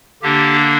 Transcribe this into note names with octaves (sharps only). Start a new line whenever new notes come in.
D3 A#3 D4 G4